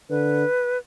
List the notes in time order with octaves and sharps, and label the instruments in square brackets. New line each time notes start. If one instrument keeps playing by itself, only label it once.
[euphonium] D3 [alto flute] B4